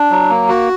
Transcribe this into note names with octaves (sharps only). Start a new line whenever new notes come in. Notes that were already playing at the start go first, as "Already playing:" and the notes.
Already playing: D4
F#3
A#3
F#4